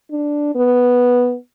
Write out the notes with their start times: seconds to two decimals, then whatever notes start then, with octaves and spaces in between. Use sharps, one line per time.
0.11 D4
0.55 B3